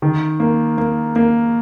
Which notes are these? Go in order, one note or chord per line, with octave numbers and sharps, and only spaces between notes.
D#3
A#3
A#3
A#3